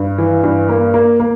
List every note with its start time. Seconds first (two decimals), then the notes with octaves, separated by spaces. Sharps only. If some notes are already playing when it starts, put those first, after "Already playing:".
Already playing: G2
0.18 E3
0.44 G2
0.69 A#3
0.94 A#3
1.20 A#3